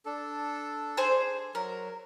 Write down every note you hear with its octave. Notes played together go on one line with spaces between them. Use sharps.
D4 A4
G#4 C5
F#3 A#4